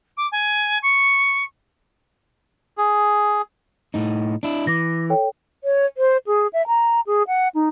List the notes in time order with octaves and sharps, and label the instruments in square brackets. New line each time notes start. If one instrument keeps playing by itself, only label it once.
[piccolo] D6
G#5
C#6
[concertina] G#4
[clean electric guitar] A2 D#4
D4 E4
[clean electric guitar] E3 [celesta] D6 A#6
[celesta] A4 C#5 G5
[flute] C#5
C5
G#4
E5
A#5
G#4
F#5
D#4